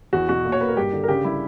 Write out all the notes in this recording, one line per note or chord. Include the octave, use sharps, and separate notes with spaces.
E2 F#4
B2 F#4
A#2
C#5
A#3 B4
A#4
G2 G4
D3
A#4
C#3 G4
G3 E4